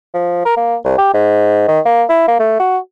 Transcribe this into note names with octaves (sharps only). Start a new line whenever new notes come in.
F3
A#4
A#3
C2
G4
G#2
D#3
A#3
E4
A#3
A3
F#4